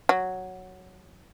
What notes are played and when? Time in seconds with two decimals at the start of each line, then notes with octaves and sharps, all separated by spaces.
0.09 F#3